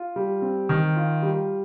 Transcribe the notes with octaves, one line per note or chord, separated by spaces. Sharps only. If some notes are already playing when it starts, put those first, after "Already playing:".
Already playing: F4
G3
C4
D#3
F4
G3